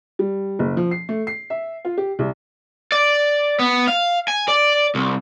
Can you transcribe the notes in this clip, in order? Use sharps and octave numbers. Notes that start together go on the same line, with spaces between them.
G3
F#1
F3
C7
A3
C7
E5
F4
G4
C2
D5
B3
F5
G#5
D5
C2